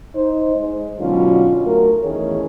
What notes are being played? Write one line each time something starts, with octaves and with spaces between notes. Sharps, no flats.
D#4 C5
G#3
B2 D3 F#3 C#4 D#4 F4
F#2 F#3 A3 A#4
E2 A2 D#3 C#4 G#4 C#5